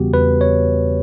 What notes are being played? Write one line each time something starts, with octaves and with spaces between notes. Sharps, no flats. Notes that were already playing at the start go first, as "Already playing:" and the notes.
Already playing: E2 C#3 E3 G3 B3 F#4 G4
E2 B4
C#5